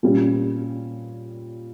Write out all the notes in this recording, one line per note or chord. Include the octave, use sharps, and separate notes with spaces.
A#2 G3 C#4 F4